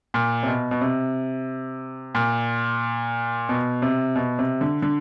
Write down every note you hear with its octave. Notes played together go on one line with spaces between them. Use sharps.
A#2
C3
B2
B2
C3
A#2
B2
C3
B2
C3
D3
D3